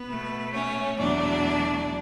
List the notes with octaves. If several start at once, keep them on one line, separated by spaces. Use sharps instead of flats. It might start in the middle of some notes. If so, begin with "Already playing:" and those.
Already playing: B3 B4
B2 A3
C#4 C#5
E2 B2 F#3 A3 D4 D5